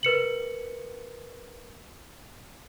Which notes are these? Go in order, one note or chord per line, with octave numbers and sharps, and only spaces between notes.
A#4 B4 C#7 F#7